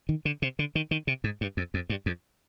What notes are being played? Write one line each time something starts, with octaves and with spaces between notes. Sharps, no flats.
D#3
D3
C3
D3
D#3
D#3
C3
G#2
G2
F2
F2
G2
F2